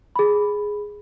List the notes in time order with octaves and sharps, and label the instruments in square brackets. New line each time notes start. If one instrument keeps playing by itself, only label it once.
[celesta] G#4 B5